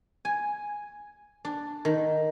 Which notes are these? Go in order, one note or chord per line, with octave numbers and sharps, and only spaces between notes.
G#5
D4
D#3